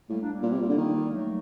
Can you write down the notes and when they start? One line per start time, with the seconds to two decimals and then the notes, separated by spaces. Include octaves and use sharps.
0.09 A2 G3 A#3
0.21 A#3 D4
0.32 G3 A#3
0.43 A#2
0.52 C3
0.61 A#2
0.69 D3
0.77 D#3
1.11 F#3 A3